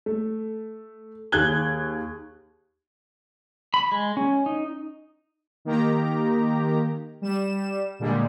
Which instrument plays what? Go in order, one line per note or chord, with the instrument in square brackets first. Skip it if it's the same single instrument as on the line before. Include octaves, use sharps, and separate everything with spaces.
[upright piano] A3
D#2 G#4 F#6 G#6 G7
[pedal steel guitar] B5
G#3
C#4
D#4
[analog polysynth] D#3 A#3 G4 A#5
G3 E7
A#2 D3 G3 G#3